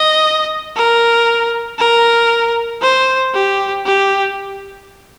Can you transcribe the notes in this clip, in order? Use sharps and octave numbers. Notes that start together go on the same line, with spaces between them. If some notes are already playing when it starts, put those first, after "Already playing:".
Already playing: D#5
A#4
A#4
C5
G4
G4